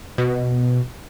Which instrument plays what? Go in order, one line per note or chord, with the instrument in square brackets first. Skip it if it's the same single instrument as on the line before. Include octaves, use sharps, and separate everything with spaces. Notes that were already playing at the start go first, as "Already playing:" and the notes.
[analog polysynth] B2